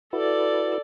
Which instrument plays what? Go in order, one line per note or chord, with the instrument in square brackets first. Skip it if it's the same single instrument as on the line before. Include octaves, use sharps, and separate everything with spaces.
[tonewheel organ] E4 F#4 B4 [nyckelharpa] A4 D5